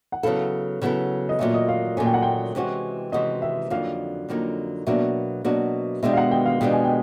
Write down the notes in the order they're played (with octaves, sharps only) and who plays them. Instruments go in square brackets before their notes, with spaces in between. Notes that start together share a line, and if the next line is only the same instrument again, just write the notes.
[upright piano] F#5
[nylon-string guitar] C#3 F#3 B3 E4 A4 [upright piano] F5
[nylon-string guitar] C#3 F#3 B3 E4 A4
[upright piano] D#5
[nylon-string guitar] A#2 F#3 A3 C#4 [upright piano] E5
[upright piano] D#5
F5
[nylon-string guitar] A#2 F#3 A3 C#4 [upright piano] G#5
[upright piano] G5
F#5
G5
[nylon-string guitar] C3 E3 G#3 C#4 F#4
[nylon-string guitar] C3 E3 G#3 C#4 F#4 [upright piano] D#5
[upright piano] E5
[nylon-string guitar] F2 D3 F#3 A#3 D#4 [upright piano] F5
[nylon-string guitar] F2 D3 F#3 A#3 D#4
[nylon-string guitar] B2 F#3 A#3 D4 F#4 [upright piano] E5
[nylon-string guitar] B2 F#3 A#3 D4 F#4
[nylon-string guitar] B2 G#3 B3 D4 G4 [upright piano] E5
[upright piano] F5
F#5
G5
F5
[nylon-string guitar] B2 G#3 B3 D4 G4 [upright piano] G5
[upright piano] G#5
G5